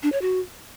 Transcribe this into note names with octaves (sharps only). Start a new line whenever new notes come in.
D4
C#5
F#4